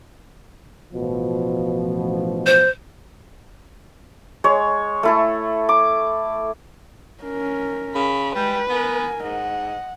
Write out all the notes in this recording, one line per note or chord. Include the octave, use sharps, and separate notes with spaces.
A1 B2 F3
C5
G#3 C#5
A3 E4 A4
D6
C#4 A#4
C#3 B5
G3 G#3 B4 G5
B3 A#4 G#5
G#2 D#5 F#5